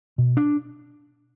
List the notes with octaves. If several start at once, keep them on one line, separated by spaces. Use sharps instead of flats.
B2
D4